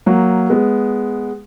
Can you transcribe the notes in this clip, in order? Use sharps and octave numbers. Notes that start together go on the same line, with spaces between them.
F#3 A#3
G#3 B3